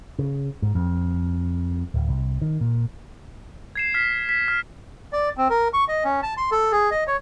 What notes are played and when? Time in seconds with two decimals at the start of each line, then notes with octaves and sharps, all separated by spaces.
0.19 C#3
0.62 G#2
0.75 F2
1.94 D1
2.09 C2
2.42 D#3
2.61 A#2
3.75 G#6 C7 E7
3.94 F6 B6
4.29 B6
4.48 F6
5.13 D5
5.37 C4
5.50 A#4
5.73 C#6
5.88 D#5
6.05 C#4
6.23 A5
6.37 C6
6.52 A4
6.72 G#4
6.91 D#5
7.07 C#5